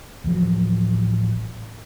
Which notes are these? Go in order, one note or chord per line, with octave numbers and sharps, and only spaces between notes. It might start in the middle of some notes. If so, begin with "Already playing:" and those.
D1 A1 F3 F#3